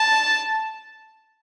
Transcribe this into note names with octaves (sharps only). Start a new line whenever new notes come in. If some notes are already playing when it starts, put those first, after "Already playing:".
Already playing: A5